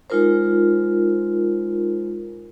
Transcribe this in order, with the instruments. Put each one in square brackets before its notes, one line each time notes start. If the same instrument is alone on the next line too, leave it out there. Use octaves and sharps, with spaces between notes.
[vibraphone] G#3 D#4 F4 A#4 C5